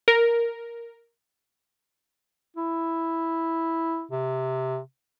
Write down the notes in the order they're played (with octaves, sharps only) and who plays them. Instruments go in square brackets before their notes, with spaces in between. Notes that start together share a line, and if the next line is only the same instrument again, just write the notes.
[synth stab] A#4
[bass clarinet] E4
C3